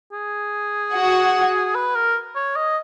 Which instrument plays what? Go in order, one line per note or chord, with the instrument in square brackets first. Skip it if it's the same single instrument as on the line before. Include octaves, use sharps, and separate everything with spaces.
[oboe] G#4
[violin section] F#4 F#5
[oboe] B4
A#4
C#5
D#5